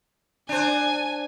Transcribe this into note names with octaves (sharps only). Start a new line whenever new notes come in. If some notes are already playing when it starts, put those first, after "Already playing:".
D4 C5 G#5